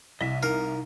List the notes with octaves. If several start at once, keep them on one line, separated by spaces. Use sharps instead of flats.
C2 D#5 E5
D#4 A#4 F5